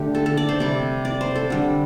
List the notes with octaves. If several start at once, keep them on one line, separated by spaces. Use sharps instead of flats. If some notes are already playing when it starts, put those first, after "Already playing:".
Already playing: D3 A3 G4
A4
A4
D5
C5
C3 G3 D5
D5
C5
A4
D3 G3